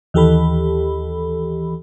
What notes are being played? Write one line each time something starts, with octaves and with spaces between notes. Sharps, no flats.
D#2 E3 G4 A4 B5